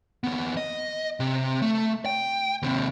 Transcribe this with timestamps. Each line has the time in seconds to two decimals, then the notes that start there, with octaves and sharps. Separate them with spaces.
0.24 D#2 B3
0.57 D#5
1.20 C3
1.62 A3
2.06 G5
2.62 D#2 C3